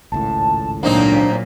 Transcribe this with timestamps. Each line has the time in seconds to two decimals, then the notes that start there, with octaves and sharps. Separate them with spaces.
0.12 G#1 C#2 A2 A5
0.83 A#2 F#3 A#3 C4 D4 D#4